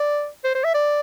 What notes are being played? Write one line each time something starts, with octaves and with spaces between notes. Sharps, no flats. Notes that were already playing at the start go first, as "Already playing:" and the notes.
Already playing: D5
C5
C5
E5
D5